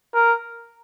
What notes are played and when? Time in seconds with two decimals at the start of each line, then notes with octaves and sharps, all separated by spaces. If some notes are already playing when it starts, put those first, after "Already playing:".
0.14 A#4